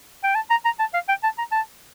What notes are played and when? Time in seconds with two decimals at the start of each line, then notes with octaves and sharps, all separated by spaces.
0.24 G5
0.35 A5
0.50 A#5
0.65 A#5
0.79 A5
0.94 F5
1.09 G5
1.23 A5
1.38 A#5
1.52 A5